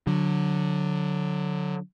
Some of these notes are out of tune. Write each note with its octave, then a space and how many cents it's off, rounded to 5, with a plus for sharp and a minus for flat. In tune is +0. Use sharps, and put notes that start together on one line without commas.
D3 +0 F#3 -15